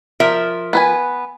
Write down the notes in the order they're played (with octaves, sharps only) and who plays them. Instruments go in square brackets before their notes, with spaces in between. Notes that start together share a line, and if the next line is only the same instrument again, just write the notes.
[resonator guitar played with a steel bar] F3 A#4 E5
[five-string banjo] B3 B4 G#5